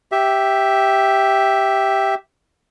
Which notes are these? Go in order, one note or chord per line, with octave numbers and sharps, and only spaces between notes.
G4 E5